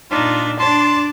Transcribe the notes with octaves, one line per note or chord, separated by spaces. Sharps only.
A#2 D4 D#4 F4
D4 D5 A5 C6